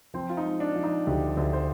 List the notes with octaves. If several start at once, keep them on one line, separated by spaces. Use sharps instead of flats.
F3 C4
F4
D#4
G#3
D4
F3
D#4
D2 G4
G4
D2
C5